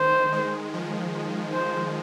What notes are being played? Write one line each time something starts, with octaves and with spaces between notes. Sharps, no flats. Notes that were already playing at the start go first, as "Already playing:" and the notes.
Already playing: D#3 C5
G#3
F3
C5